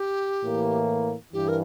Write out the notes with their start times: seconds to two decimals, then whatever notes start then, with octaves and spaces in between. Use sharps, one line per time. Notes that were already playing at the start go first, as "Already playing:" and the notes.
Already playing: G4
0.41 A2 E3 A#3
1.33 G2 E3 G4
1.48 A#4